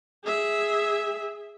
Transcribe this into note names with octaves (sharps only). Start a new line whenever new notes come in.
G#4 E5